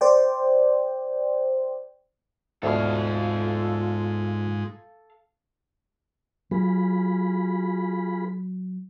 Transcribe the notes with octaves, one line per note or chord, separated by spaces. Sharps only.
C5 D5 G5
D2 G#2 B2 F4 A4 F5
F#3 F4 G#4 B5